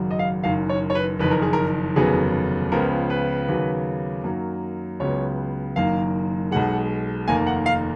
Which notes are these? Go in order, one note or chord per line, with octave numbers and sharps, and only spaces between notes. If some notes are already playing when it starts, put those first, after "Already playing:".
Already playing: G#1 F#2 C#3 F#3
D#5
F5
F#1 F#2 D#3 F5
C#5
C#5
B4
F#1 F2 D#3 B4
A#4
G#4
A#4
F1 D#2 C#3 F#3 B3 G#4
C#2 C#3 F3 B3 A#4
B4
D#2 C#3 F#3 B3
F#2 D#3 F#3 A#3
C#2 C#3 F#3 B3 C#5
F#1 F#2 D#3 A#3 F5
B1 B2 G#3 F#5
F1 D#2 D#3 A#3 G#5
F#5
F5